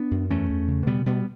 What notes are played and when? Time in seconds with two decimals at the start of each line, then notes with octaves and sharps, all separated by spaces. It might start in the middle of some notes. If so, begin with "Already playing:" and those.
Already playing: B3 D4
0.11 F#2
0.30 E2 A3 C#4
0.50 E2
0.68 C#3
0.86 B2 G3 B3
1.06 B2 G3 B3